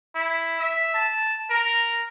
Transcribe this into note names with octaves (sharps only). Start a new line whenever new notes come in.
E4
E5
A5
A#4